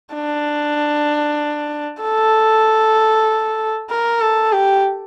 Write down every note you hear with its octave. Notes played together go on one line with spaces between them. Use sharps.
D4
A4
A#4
A4
G4